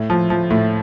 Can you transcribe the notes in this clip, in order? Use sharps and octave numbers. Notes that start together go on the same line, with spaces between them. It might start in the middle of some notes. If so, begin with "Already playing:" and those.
Already playing: A2
F3
F3
A2